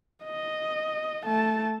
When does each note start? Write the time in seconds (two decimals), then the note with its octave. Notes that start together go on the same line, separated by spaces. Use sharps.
0.24 D#5
1.25 A3 A5